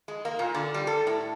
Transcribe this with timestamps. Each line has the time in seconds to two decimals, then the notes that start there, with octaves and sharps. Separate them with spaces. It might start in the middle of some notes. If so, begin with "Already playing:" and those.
0.08 G#3
0.25 A#3
0.39 A#2
0.55 D3
0.74 G3
0.87 A4
1.07 A2